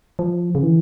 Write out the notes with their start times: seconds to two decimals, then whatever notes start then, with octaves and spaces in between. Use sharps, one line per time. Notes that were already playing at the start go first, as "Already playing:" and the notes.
0.19 F3
0.55 C#3
0.63 E3